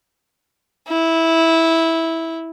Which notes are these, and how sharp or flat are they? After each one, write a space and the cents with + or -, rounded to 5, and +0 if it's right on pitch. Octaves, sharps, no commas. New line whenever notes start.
E4 -10